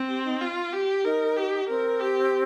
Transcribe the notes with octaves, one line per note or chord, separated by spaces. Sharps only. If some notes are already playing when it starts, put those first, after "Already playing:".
Already playing: C4
G4
D#4
F4
G4
D#4 A#4
G4
C4 A#4
G4